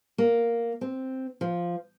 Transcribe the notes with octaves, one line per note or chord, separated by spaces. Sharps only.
A#3
C4
F3